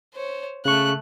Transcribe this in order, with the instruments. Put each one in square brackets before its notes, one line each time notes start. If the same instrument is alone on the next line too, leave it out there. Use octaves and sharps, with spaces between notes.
[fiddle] C5 C#5
[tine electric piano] C#3 C#6 [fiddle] A3 F#6